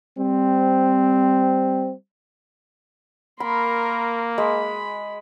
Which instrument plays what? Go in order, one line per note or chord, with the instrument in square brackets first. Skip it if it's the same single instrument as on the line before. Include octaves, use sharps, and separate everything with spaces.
[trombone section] G3 C4
[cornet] A#3 [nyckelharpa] A#4 C6 [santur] B5
[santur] G#3 [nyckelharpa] B5